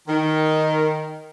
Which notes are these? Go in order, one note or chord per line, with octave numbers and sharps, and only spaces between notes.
D#3